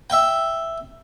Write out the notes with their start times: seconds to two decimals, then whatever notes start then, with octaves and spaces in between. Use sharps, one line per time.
0.10 E5 G5